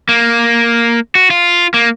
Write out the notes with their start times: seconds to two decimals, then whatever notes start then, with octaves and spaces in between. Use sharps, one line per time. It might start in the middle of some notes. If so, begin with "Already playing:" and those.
0.09 A#3
1.15 F#4
1.30 F4
1.74 A#3